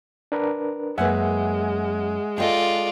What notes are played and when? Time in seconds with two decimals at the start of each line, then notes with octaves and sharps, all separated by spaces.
0.32 D4 A#4 B4
0.98 F#2 G#3 A#3 B4 E5 F#5 G#5
2.38 F4 A4 D5 D#5 G5